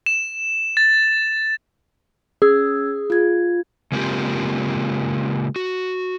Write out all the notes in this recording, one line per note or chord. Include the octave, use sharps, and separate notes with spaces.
E7
A6
C#4 G#4 E6 G#6
F4 G#6
C#3 G#3 A#3 C4 F4 G4
F#4